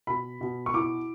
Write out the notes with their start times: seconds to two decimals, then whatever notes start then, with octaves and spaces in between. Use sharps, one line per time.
0.07 B2 B5
0.41 B2
0.66 C#6
0.74 E4 D6